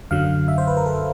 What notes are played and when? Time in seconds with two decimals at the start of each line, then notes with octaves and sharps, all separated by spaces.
0.11 F#2 D3 F#3 F5
0.48 E5
0.58 C5
0.67 B4
0.77 A#4
0.86 A4